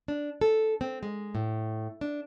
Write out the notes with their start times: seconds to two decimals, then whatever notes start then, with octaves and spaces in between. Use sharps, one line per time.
0.08 D4
0.41 A4
0.81 C4
1.03 G#3
1.35 A2
2.01 D4